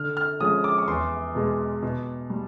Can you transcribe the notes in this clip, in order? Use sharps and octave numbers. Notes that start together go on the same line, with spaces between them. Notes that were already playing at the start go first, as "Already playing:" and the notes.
Already playing: D3 F6
F6
F3 G#3 C#4 D#6
D6
C#6
E2 C6
B2 G#3
B2
G3